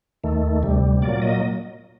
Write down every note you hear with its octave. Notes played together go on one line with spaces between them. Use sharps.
D#2 D#3 A3
D2 C3 G3
A#2 F#3 A#3 D5
D#5